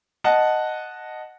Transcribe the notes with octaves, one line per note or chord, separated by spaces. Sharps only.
D#5 F#5 A5